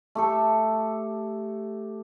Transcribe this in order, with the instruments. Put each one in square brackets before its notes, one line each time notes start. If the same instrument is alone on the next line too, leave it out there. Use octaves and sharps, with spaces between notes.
[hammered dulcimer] A3 G4 A4